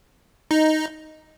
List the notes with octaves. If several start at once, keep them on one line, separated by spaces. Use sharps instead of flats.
D#4